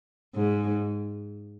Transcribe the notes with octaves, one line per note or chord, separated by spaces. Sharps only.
G#2